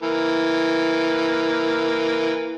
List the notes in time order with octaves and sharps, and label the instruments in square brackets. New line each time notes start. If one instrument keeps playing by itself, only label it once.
[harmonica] E3 A#3